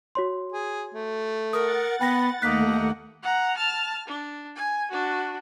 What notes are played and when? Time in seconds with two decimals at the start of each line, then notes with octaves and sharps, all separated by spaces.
0.15 F#4 C#5 C6
0.52 G#4
0.95 A3
1.53 A#4 F#5 D#6 A6
2.01 B3 B4 G5 A#6
2.42 D#2 A3 A#3 D#4 F#5 F#6 B6
3.23 F#5 A#5
3.57 A5 F6
4.08 D4
4.56 G#5
4.91 D4 F#4